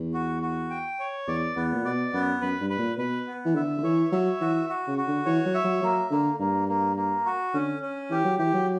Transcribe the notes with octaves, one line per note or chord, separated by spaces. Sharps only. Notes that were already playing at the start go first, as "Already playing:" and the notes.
Already playing: E2
F#4
F#4
G5
C#5
E2 D5
E2 B3
A#2
B2 D5
F#2 B3
F#2 B4
G2
B4
A#2
B2 B4
B3
E3
D3 E5
D3
E3 C#5
F#3 E5
E3 F#4
F#4
C#3
F#4
D3
E3 C#5
F#3
E5
F#3
F#3 A#3
D3 A#3
G2 A#3
A#3
A#3
F#4
D3 C#4
C#4
E3 G4
F#3
E3 G4
F#3